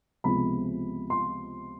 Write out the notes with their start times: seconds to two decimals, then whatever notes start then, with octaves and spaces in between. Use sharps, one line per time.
0.24 C#2 C3 F3 G#3 B3 B5
1.10 C6